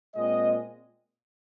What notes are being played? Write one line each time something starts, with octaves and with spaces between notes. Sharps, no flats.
A#2 G#3 C4 D#5